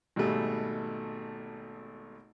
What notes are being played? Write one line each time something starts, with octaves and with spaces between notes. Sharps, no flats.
G#1 B2 G3 A3 G#4